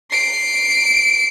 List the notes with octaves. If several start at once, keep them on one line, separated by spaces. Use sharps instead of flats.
C7 D7